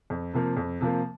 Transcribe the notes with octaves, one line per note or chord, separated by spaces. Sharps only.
F2
C3 F3 A#3
F2
C3 F3 A#3